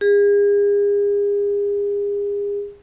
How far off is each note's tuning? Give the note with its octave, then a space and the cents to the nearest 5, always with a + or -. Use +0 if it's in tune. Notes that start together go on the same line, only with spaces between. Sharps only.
G#4 -40